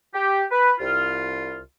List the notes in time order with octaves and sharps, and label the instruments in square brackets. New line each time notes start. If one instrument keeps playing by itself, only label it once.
[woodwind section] G4
B4
C2 F4